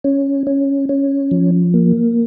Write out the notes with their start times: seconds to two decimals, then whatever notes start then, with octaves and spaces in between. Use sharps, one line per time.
0.04 C#4
0.47 C#4
0.89 C#4
1.31 F3
1.74 A#3